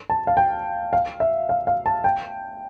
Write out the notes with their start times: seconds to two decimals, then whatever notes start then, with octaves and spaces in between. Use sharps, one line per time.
0.10 A5
0.27 F5
0.37 G5
0.93 F5
1.20 E5
1.49 F5
1.67 F5
1.86 A5
2.04 G5